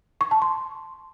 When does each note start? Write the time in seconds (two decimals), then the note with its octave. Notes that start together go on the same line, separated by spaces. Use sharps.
0.21 C#6
0.31 A5
0.42 C6